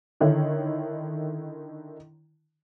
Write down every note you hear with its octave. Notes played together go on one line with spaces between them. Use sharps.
D3 D#3 E4 C#5